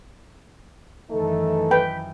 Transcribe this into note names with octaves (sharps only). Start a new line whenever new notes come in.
F#2 D#3 E3 A3 D#4 A4
B4 G5